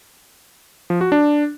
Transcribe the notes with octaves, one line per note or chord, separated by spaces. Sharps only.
F3
F#4
D4